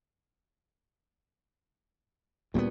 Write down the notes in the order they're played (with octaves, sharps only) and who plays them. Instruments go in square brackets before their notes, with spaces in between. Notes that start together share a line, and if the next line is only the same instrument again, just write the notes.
[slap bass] D2 A#3 B3 [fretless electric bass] A#2 G3